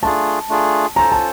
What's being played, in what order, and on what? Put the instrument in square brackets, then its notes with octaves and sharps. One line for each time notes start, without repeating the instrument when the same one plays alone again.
[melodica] A3 D4 F4 G#4 [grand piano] A5
[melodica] A3 D4 F4 G#4
[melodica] C#4 F4 A4 C5 [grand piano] A#5
[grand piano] A5